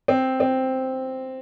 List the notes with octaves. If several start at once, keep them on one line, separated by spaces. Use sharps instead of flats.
C4
C4